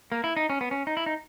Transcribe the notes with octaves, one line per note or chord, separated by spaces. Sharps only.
A#3
E4
D#4
C#4
B3
C#4
D#4
E4
D#4